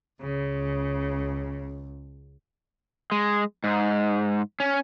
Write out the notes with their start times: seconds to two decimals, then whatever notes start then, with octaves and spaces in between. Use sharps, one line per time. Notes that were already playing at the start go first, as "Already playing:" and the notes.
0.22 C#2 C#3
3.12 G#3
3.64 G#2
4.60 C#4